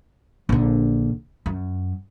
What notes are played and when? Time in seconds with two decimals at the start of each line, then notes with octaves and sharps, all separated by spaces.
0.49 A#1 D3
1.46 F#2